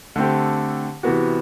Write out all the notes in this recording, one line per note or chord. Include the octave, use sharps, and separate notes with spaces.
D3 A3 C4 G4
C3 E3 B3 F#4